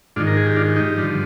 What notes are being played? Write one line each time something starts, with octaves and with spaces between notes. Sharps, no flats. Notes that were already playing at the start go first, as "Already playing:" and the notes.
G#2 D#3 D4 F4
A#4
G#4
G4
D4 F4
D#4 G4
G2 D3 F3